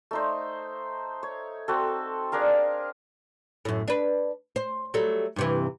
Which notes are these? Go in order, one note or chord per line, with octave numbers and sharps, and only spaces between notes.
A3 D#4 C5
C#5
C4 F#4 A4
D4 G#4 A#4 F5
F#2 A2
D4 B4
C5
F#3 G3 A3
G2 C3 E3